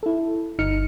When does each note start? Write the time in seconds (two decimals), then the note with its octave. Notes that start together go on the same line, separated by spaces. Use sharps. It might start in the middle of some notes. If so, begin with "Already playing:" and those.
0.03 E4 A4
0.59 G1 D#4 F6 C#7